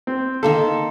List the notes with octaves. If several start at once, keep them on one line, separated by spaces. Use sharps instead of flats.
C4
D#3 A#3 A4 C5